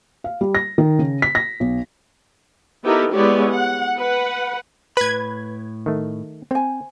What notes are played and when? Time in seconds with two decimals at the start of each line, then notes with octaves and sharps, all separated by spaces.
0.24 F5
0.41 G3
0.55 A#6
0.78 D#3
0.99 C#3
1.22 B6
1.35 A#6
1.60 B1
2.85 B3 D#4 E4 G4 A4 A#4
3.13 G#3 B3 E4 G4 C#5 D5
3.51 F#5
3.97 B4 F#5
4.97 A2 B4 B5 G#6
5.86 D#3 A3
6.51 C4 C5 G#5